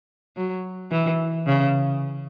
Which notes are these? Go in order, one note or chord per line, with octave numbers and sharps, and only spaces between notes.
F#3
E3
C#3